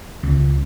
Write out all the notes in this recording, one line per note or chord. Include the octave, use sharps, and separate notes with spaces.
C#2